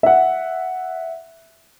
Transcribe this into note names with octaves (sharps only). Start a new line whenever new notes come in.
E5 F#5